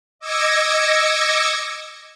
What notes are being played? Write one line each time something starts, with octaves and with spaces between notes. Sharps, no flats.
D#5 D6 E6 G#6 A#6 C#7